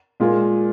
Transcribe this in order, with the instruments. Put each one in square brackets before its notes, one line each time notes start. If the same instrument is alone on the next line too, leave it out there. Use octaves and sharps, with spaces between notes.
[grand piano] A#2 G#3 F4 G#4